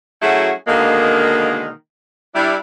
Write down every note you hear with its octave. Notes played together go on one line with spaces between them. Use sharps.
F#3 A3 C#4 E4 F#4 G#4
B2 D3 D#3 G#3 A#3
G3 D4 E4